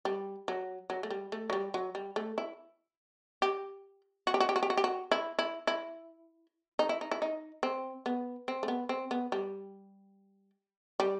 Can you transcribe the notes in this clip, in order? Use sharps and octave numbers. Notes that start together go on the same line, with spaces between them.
G3
F#3
F#3
A3
G3
A3
F#3
G3
F#3
G3
A3
E4
G4
F#4
G4
F#4
G4
F#4
G4
F#4
G4
F#4
E4
E4
E4
D#4
E4
D#4
E4
D#4
C4
B3
C4
A3
B3
C4
B3
G3
G3